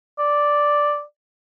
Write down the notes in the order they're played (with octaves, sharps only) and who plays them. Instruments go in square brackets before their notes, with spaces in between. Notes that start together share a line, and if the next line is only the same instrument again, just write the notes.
[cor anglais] D5